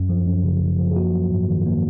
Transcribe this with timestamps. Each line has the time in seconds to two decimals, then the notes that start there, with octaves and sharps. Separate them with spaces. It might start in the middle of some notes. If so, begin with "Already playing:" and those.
Already playing: F#2
0.09 F3
0.27 F#2
0.44 C#3
0.61 F#2
0.79 F3
0.91 G#4
0.96 A#3 F#4
1.14 F#3
1.31 G#2
1.48 D#3
1.66 A#3